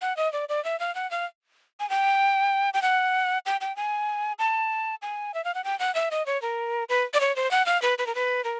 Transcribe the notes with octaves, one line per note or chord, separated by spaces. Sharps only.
F#5
D#5
D5
D5
E5
F5
F#5
F5
G#5
G5
G5
F#5
G5
G5
G#5
A5
G#5
E5
F5
F#5
G5
F#5
E5
D#5
C#5
A#4
B4
D5
C#5
C5
F#5
F5
B4
B4
A#4
B4
A#4